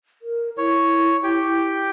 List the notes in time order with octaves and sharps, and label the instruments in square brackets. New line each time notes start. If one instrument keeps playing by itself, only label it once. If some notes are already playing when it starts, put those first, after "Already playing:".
[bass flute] A#4
[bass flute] E4 [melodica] C#5
[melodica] G4 G5